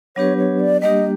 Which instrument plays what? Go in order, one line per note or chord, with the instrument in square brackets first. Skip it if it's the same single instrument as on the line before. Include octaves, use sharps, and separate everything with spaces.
[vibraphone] F#3 B3 D4 G4 B4 [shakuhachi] C#5
[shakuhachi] C#5
D5
[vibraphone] G3 A#3 D4 G4 [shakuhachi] D#5